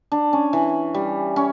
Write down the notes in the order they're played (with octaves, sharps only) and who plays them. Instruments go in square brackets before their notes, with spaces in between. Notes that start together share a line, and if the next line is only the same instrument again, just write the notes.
[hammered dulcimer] D4
C#4
E3
G3
C#4